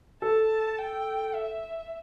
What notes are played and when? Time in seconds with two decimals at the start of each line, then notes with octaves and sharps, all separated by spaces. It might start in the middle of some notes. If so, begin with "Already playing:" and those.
0.22 A4 A5
0.79 G5
1.34 E5